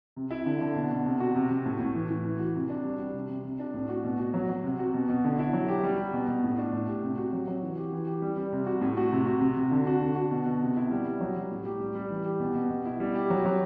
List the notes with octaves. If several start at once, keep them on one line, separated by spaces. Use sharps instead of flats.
C3
E4
D3
D3
B2
B2
C3
F#4
C3
C3
A2
A2
E3
E3
E3
F#4
C3
D4
G3
G3
C3
C3
C3
D4
A2
F#4
B2
F#4
F#3
F#3
C3
F#4
B2
B2
D3
E4
F#3
G4
G3
G3
B2
B2
A2
D4
A2
G4
C3
F#4
F#3
F#3
E3
G4
E3
G4
G3
G3
C3
F#4
A2
F#4
C3
F#4
C3
C3
D3
F#4
D3
F#4
B2
B2
C3
E4
G3
G3
F#3
F#3
A2
G4
G3
G3
E3
G4
B2
B2
B2
E4
G3
G4
F#3
F#3